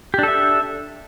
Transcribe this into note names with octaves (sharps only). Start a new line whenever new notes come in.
D4 G4 A4 E5